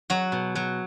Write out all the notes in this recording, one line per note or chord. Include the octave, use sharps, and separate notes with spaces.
F#3 F#4
B2
F#3